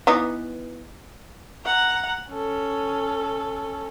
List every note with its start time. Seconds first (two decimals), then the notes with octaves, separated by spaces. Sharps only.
0.07 E3 B3 D#4
1.64 F#5 A#5
2.30 C#4 A4